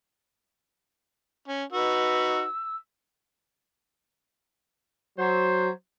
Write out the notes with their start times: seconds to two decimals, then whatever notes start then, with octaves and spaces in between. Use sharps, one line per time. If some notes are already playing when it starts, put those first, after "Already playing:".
1.48 C#4
1.72 D#4 F#4 B4 E6
5.18 F#3 C5